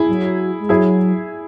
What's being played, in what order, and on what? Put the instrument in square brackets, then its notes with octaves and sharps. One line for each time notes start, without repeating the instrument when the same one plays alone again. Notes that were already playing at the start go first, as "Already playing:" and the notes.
Already playing: [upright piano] E4 G#4
[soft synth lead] F#3
G#3
[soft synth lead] F#3 [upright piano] E4 G#4